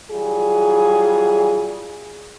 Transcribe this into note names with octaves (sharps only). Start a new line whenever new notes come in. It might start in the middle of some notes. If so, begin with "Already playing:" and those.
E3 F#3 G3 F4 G#4